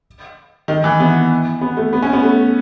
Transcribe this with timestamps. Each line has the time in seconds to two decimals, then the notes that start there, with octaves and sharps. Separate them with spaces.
0.68 D#3
0.84 E3
1.00 B3
1.61 B3
1.77 A3
1.93 B3
2.02 C#4
2.13 B3
2.23 A3